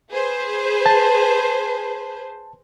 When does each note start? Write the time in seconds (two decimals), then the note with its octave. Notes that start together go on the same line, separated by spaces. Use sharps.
0.11 G#4 B4 C5
0.86 A5